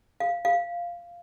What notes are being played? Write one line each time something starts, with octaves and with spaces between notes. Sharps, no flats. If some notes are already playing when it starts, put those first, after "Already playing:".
F5
F5